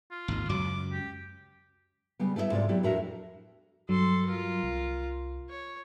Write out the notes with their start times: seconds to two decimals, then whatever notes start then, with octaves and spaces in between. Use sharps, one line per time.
0.11 F4
0.28 G#1 D#2
0.49 C#2 F#2 F#3 D6
0.92 G4
2.19 C#3 G3 B3
2.36 A3 B3 E4 D5 E5
2.51 G#2 C3 F4 D5
2.69 F#3 B3 E4 G4
2.83 F2 A2 D4 F#4 A#4 E5
3.89 G2 F#3 A4 C6
4.27 F4 A#4
4.63 C2
5.50 C#5